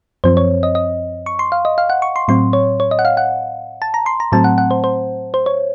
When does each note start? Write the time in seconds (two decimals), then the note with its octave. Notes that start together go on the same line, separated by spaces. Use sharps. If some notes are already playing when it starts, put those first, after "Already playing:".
0.24 F#2 F3 C4 C5
0.37 C#5
0.63 D#5
0.75 D#5
1.26 C#6
1.39 C6
1.52 F5
1.65 D#5
1.78 F5
1.90 F#5
2.02 C#6
2.16 C6
2.28 A2 F#3 C4 C6
2.53 C#5
2.80 C#5
2.91 D#5
2.99 F#5
3.05 F5
3.17 F#5
3.82 A5
3.94 A#5
4.06 C6
4.20 A#5
4.32 A2 F#3 A3 C4 A5
4.44 F#5
4.58 F#5
4.71 C5
4.84 C5
5.34 C5
5.46 C#5